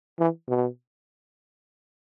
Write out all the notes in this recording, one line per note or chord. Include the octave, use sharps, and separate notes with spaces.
E3
B2